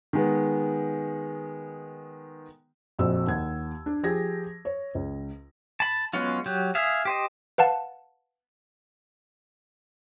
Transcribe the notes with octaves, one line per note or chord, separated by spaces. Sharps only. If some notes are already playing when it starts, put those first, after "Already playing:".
D#3 G#3 B3
A#1 F2 F#4 C5 E6
D#2 F#5 G#6
D4
F3 G4 G#4 G#6 A#6
C#5
C#2
A5 B5
F#3 G#3 B3 C#4 F4
F#3 G4
G#4 E5 F5
G4 C5 D#5
B4 F5 F#5 A5